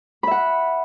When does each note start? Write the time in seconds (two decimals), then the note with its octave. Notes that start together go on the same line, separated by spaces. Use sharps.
0.23 B5
0.27 E5
0.31 F#5